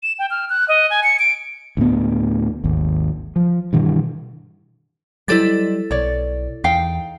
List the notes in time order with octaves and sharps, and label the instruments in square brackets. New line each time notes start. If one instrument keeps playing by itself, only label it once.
[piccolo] E7
G5
F6
F#6
D#5
G#5
C#7
D7
[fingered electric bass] D2 A2 B3
G#1 D#2
F3
G2 B2 D#3 E3
[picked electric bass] F#3 G3 [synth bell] E4 A4 A6 [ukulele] C5 D5 D#5
[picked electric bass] B1 [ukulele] C#5 D5
[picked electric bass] E2 [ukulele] D#4 F5 G5